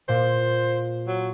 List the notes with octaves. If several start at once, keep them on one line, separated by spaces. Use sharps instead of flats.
A#2 C5
F#3